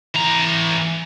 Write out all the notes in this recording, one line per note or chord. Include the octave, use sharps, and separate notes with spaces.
E3 A#5